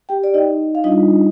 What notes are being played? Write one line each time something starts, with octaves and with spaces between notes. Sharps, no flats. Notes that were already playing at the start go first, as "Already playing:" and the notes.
G4 G5
D5
D#4 D#5
F5
G3 D4 D#4 F4 D#5